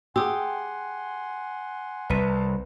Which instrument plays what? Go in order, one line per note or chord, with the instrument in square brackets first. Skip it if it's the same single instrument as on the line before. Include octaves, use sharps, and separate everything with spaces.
[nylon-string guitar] G4 [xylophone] G#4 D#6 E6 [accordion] F#5 G#5 C6
[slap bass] C2 [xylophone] B4 B6 D#7 [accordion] A5 A#5